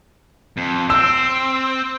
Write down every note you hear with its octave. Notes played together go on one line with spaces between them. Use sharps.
F2
C4 E6